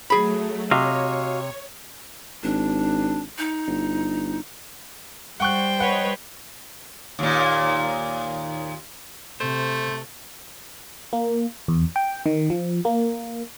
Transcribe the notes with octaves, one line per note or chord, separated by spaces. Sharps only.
F#3 A3 G#4 B5
C3 F#4 C#5 D#5 F5
G#1 D4
D#4
G1
G3 C5 F#5 G5 C#6 F#6
B4 C#5 D#5 F#5
D#2 A#2
C3 A3 C5
A#3
E2
G5
D#3
F3
A#3